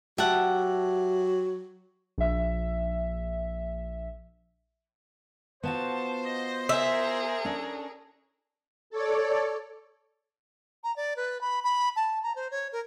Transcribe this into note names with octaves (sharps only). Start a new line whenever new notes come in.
F#3 G4 E5 F#5 A5
A#1 E5
B3 F4 F#4 C5 A5
D#5
G#4 A#4 E5
C#4 D4 A4
A4 C#5 D5
A#5
D5
B4
B5
B5
A5
A#5
C5
C#5
A#4